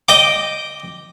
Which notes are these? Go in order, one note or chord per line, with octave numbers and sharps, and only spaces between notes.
D#5 G5 D6